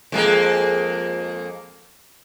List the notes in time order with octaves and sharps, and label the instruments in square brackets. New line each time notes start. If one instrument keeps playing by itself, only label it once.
[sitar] F2 G#3 A#3